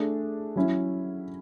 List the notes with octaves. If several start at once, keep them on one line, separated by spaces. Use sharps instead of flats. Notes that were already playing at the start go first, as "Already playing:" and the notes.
Already playing: A3 D4 G#4
F#3 C#4 E4